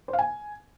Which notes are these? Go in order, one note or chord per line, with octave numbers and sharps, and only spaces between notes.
C5
F5
G#5